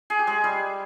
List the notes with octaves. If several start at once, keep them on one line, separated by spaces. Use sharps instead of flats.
G#4
G4
G#3 G#4
G3 G4